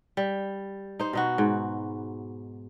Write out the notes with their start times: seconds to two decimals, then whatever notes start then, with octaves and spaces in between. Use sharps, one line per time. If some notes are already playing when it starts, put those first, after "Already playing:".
0.17 G3
0.99 D#4 C5
1.13 B2 D#4 F#4
1.38 G#2